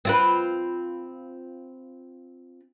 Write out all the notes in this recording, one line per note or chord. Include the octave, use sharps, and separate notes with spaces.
C4 F4 B4